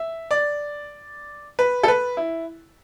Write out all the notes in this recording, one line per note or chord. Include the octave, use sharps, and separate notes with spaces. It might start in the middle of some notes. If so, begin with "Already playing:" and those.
Already playing: E5
D5
B4
A4
B4
E4